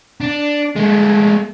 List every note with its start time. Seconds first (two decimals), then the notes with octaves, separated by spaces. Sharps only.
0.21 D4
0.76 G#3 A3